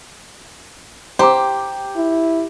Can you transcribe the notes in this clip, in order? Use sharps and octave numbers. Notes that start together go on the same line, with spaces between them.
G4 C5 G5 A#5 D6
E4